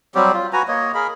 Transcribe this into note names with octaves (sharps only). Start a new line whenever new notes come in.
F#3 G3 C4 G4
F4
F#4 B4 G#5 A#5
A#3 C#5 D#5
G#4 A#4 B5